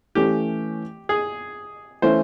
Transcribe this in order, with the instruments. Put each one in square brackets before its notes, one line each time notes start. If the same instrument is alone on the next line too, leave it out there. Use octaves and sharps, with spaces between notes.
[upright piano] E3 A3 C#4 [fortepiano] G4
[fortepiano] G#4
[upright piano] E3 A3 C#4 E4 [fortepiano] C5